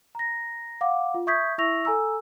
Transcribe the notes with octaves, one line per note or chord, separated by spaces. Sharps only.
A#5 A#6
F5 F#5 D6
F4
E5 C#6 D#6 G6 G#6 B6
E4 E5 C#6 E6 A#6 F7
A4 G#5 A#5 E6